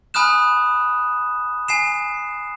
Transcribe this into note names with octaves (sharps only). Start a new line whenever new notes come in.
G#5 B5 D#6 F6 F#6 E7
G#5 C7 E7